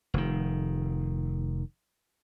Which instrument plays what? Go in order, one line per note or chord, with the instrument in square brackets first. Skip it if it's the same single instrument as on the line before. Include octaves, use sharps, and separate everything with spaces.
[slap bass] F1 D#3